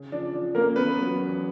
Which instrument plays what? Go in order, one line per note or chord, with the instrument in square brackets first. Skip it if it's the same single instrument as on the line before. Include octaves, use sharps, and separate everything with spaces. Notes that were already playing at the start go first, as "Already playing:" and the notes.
Already playing: [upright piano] C#3
[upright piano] F3 [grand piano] D4
[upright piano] F3
[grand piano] A#3 A#4 [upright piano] C#4
[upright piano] E2 [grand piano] B3 B4
[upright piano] F#3
E2